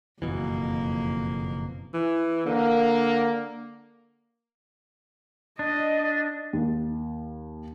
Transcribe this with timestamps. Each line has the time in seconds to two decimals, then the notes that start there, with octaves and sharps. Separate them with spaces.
0.22 F#1 F2 B2 E3 A#3
1.94 E3
2.46 D3 A#3
5.59 D4 D#5
6.53 D#2